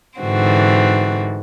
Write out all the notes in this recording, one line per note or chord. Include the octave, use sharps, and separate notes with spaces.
G#2 D3 E3 C4 F#4